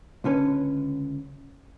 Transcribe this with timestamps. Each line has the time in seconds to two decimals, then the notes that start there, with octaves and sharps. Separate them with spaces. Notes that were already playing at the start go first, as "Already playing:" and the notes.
0.24 C#2 D3 C#4 B4